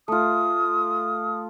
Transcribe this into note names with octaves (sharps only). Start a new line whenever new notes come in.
A3 F4 D#6